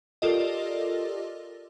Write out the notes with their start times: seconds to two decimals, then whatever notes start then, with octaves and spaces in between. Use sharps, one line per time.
0.22 F4 G4 A4 A#4 D5 D#5